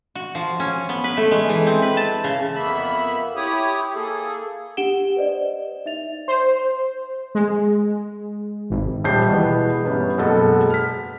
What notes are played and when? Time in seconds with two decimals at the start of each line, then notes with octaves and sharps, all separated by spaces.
0.15 F#4
0.35 F3
0.60 C#4
0.89 B3
1.04 B4
1.17 A3
1.31 G#3
1.49 E3
1.67 C4
1.82 B4
1.97 A5
2.24 C#3
2.55 F2 A#3 B3 E5 B5 E6
3.36 E4 G4 C#5 D#6
3.95 A#3 G#4 A4
4.77 D4 G4 F#5 D7 E7 G7
5.16 B4 C5 D5 D#5
5.85 D#4 E5 A6 F7
6.28 C5
7.35 G#3
8.70 G#1
9.04 D#1 G3 A5 G6 C7
9.28 B2 E3 G#3 B3
9.85 G1 B3 C#4 G4
10.18 F#1 B2 G#3 A4 F#5
10.70 F6 B6